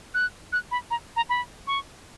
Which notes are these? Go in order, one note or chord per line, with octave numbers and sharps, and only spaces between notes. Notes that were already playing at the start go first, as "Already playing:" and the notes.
F#6
F#6
B5
A#5
A#5
B5
C#6